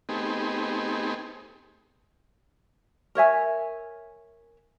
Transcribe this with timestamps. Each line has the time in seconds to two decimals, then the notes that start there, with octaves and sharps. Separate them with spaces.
0.09 A3 B3 C4 D#4 G4 G#4
3.15 A#4 C#5 E5 G#5